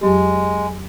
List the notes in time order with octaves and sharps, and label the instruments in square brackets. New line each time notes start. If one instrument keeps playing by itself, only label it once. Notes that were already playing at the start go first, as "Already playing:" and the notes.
[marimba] F2 F#3 G4 [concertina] G#3